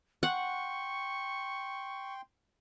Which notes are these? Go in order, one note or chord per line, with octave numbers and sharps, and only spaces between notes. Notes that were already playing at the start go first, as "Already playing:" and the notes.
F#5 G5 C6 C#6